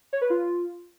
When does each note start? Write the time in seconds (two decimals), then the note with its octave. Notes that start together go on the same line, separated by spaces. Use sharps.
0.13 C#5
0.21 B4
0.30 F4